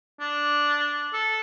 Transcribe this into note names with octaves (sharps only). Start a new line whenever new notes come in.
D4
A4